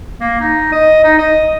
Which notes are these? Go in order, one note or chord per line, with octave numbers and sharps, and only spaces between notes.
A#3
D#4
D#5
D#4
D#5